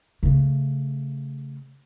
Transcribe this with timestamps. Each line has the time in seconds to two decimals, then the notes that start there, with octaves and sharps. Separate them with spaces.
0.23 C#3 A3